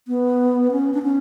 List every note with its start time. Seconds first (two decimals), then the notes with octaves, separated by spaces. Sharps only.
0.08 B3
0.71 C#4
0.94 D4
1.03 C#4